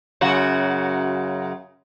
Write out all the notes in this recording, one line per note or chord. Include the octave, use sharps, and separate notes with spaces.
F#2 C#3 F#4